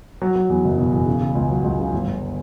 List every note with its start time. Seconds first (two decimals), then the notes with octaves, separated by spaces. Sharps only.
0.22 F#3
0.36 F#3
0.49 E2
0.64 F#1
0.78 B2
0.92 E2
1.06 C#3
1.21 C#3
1.35 C#2
1.50 F#3
1.64 C#2
1.79 C#3
1.93 G1
2.07 G1